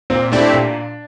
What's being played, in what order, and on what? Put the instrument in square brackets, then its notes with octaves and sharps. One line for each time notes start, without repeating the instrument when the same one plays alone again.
[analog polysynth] A#2 [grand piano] C4
[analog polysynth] A3 C4 E4 G4 [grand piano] D4
[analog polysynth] A#2